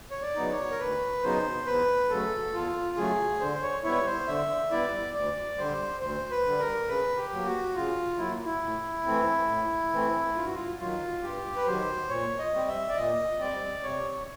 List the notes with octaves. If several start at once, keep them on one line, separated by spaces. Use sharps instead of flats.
C#5
D5
C#3 F#3 B3 D#4
C#5
A#4
D2 B4
C#3 F#3 B3 D#4 C5
E2 B4
C#3 F#3 A3 A4
E2 F4
C#3 F#3 A3 G#4
D3 C5
C#5
G3 B3 E4 C#5
C5
D3 E5
G3 B3 E4 D5
D2 D5
D3 G3 C5
D2 C5
B4
D3 G3
A#4
C#3 B4
G4
F#3 A#3
F#4
C#3 F4
F#3 A#3 E4
E4
A2
E3 A3 C4
A2
E3 A3 C4
G2 F4
F#4
F4
D#3 F#3 F4
G2 G4
B4
D#3 F#3 C5
A#2 C#5
D#5
G3 C4
E5
D5
A#2 D#5
G3 C4 D5
C3 C#5